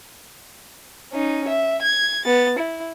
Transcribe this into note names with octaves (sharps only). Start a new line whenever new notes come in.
C#4 D#4
E5
G#6
B3 A6
E4